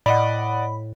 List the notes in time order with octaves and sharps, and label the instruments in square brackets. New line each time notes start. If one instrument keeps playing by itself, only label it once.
[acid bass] A2 [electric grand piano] D5 D#5 F#5 [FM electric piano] B5